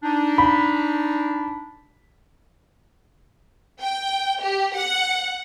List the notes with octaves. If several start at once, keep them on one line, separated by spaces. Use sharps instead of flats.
D4 D#4
B5
G5
G4
F#5